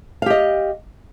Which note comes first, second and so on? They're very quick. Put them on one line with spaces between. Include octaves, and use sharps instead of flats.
F5 G4 D#5